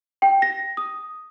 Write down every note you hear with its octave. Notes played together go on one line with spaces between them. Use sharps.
G5
A#6
D#6